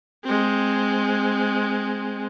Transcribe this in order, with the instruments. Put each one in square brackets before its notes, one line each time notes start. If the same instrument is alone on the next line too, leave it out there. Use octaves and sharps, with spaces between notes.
[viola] G#3 C4